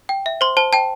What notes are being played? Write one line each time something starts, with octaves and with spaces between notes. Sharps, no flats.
G5
E5
C5 C6
C5 A5
G5 A5